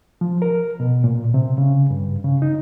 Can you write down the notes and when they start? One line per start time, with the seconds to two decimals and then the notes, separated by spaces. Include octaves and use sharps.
0.21 F3
0.42 A#4
0.80 B2
1.04 A#2
1.34 C3
1.58 C#3
1.90 G2
2.24 C#3
2.42 D#4